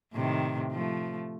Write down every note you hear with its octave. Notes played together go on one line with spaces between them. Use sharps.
A2 C3 D#3
F3 A3